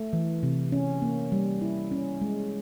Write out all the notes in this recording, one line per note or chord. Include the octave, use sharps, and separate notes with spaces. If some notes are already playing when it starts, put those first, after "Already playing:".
Already playing: A3
E3
C3
C#4
A#3
G3
E4
C#4
G#3